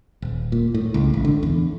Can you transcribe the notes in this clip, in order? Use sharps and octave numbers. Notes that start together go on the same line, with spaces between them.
D#1
A#2
A2
C#2
A1
D3
E2